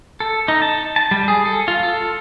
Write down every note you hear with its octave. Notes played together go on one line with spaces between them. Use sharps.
A4
D#4
A5
A5
G3
G#4
A4
F4
A4